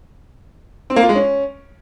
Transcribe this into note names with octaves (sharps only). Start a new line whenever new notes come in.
C4
A#3
F4
G#3
C#4